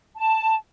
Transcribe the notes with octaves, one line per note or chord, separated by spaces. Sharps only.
A5